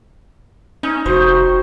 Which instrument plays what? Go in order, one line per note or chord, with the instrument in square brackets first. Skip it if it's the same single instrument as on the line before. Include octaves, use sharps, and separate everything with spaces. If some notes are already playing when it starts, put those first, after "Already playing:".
[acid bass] C#4 [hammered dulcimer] D#4
[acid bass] F1 [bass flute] F#4 [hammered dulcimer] C5